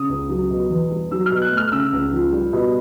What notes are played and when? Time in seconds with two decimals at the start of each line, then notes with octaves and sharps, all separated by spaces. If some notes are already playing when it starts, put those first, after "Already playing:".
Already playing: C#3 D#6
0.09 C#2
0.29 F#3
0.50 B2
0.70 E2
0.91 G3
1.11 F#3 E6
1.26 F6
1.32 B2
1.42 F#6
1.51 A3
1.57 F6
1.72 C#3 E6
1.93 C#2
2.13 F3
2.32 G3
2.53 B2